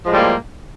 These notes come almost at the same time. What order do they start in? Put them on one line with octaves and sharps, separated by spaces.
F3 G#3 A2 G3 A#3